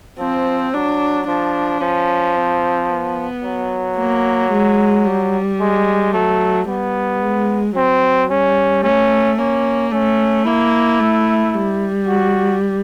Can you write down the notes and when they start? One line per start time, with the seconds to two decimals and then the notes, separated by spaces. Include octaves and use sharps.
0.19 F3 C4
0.74 F#3 D4
1.27 F3 D4
1.81 F3 C#4
2.36 C4
2.90 B3
3.44 F#3
3.97 A#3
4.52 G#3
5.06 G3
5.60 G#3
6.13 F#3 A3
6.67 G3 B3
7.22 G#3
7.76 F#3 C4
8.30 G3 C#4
8.83 A3 C#4
9.38 A#3 C#4
9.92 A3 C#4
10.46 A#3 E4
11.00 A3
11.54 G3
12.08 F#4